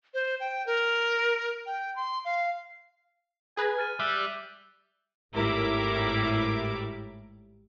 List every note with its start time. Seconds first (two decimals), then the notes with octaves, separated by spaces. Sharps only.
0.14 C5
0.40 G5
0.67 A#4
1.66 G5
1.96 C6
2.25 F5
3.57 G#4 B4 G#5 A#5
3.78 F6 A6 D#7
4.00 G3 E5 F#6
5.34 G#1 A2 G3 E4 A#4 D6